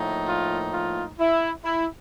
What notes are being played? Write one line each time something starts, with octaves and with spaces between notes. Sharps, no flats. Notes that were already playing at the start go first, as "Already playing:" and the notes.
Already playing: A2 F3 A#3 D#4
F4
F4
E4
E4